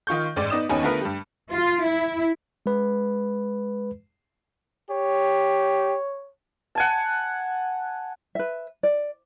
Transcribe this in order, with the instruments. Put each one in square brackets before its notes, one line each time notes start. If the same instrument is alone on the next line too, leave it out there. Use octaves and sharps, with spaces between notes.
[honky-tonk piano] D#3 F4 C#6 G6
A1 G#2 D5
B3 D#4 D5 D#6 E7
D#2 B3 C#4 D#4 G#5 B5
D3 A3 B3 F4 A#4 B4
G2 G3
[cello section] F4
E4
[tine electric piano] G#3 B4
[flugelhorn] G4 [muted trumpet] C#5
[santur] F#5 G#5 A5
[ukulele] B4 E5
D5